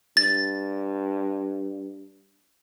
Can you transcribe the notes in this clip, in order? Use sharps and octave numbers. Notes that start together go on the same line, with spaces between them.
G2 A6